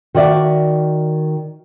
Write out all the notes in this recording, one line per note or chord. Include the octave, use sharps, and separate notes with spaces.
D#3 F#4 D5 E5